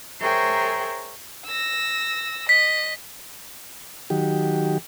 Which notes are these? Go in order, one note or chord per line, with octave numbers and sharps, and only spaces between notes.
G#4 A#4 C5 C#5 E5 G5
E6 A#6
D#5 B6
D#3 F#3 G4